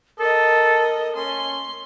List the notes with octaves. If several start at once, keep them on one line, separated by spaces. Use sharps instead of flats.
A4 A#4 D#5
C#4 C6